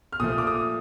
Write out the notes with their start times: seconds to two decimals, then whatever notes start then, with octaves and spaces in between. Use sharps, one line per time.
0.12 F6
0.20 A#2 F3 A3 D#6
0.38 D6
0.47 D#6